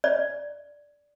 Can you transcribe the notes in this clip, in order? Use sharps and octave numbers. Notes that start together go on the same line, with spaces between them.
D5